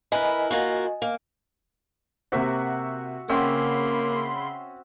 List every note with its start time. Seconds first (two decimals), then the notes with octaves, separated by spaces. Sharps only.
0.12 E4 A#4 B4 D#5 G#5
0.51 A#3 F4 F#4
1.02 A#3
2.32 C3 A#3 F#4 C5 E5
3.29 C#3 A#3 C4 C#4 F#4 E5 B5 C6